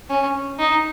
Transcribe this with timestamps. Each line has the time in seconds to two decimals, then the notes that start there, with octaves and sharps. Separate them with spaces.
0.10 C#4
0.59 D#4